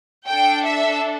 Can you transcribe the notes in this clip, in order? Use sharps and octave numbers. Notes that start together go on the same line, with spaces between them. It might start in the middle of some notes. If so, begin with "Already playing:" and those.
D4 A4 G5
E5